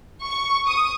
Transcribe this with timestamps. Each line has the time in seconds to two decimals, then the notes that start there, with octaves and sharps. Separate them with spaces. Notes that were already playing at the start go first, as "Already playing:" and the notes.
0.23 C#6
0.67 D#6